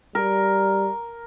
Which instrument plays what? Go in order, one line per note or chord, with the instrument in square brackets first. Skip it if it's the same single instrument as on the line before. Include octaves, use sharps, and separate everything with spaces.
[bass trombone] G3 [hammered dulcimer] A#4